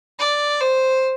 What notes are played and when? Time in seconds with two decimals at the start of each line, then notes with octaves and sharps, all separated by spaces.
0.19 D5
0.61 C5